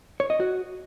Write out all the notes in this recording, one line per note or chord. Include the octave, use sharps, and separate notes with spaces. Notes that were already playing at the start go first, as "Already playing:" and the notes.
C#5
D#5
F#4